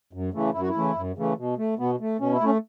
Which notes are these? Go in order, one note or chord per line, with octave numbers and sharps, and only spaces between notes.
F#2
C#3 E3 A3
F#2 E4
F#4
E4
C#3 E3 A3
F#2
C#3 E3 A3
B2
A3
B2 B3
A3
B2 C#4
E4
A3 C#4